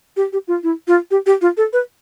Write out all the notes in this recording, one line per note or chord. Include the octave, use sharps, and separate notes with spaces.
G4
G4
F4
E4
F4
G4
G4
F4
A4
B4